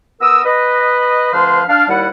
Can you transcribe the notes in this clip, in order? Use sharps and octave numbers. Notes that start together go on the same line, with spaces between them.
B3 A#4 D#6 E6
B4 D#5
D2 F3 B4 C5 F5 C6
D4 F5
D#2 G3 E4 F#5